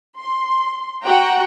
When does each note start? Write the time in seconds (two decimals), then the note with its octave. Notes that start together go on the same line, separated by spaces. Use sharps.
0.18 C6
1.05 F#4 F#5 G5 A#5